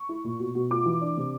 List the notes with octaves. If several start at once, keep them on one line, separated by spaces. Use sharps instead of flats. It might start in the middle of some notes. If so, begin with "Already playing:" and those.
Already playing: C#6
E4
A#2
B2
B2
F4 D6
E3
D4
C3